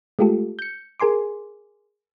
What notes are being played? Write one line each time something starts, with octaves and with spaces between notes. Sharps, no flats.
G#3 A3 F4 G4 A4
G6 C#7
G#4 A#4 G#5 C6 D6